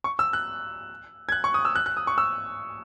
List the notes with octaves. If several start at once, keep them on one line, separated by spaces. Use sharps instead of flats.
C#6
E6
F#6
G#6
F#6
C#6
D#6
E6
F#6
F#6
D#6
C#6
E6